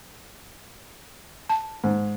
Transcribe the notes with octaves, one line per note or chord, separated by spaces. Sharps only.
A5
G#2